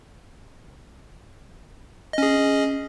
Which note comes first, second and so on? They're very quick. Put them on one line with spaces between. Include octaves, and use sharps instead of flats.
D#5 C#4 G#4